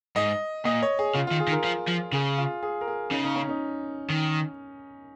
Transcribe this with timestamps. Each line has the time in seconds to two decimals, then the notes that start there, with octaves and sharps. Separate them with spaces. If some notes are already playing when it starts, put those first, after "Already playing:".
0.16 G#2 D#5
0.65 A#2 D#5
0.82 C#5
0.99 G#4
1.15 C#3 F4
1.27 D#3 F4
1.40 G#4
1.47 D#3
1.52 A#4
1.64 F3
1.88 F3
2.13 C#3 G#4
2.38 F4
2.63 G#4
2.81 A#4
2.88 G#4
3.11 C#3 D#4
3.24 D#4
3.36 C#4
3.49 D#4
4.10 D#3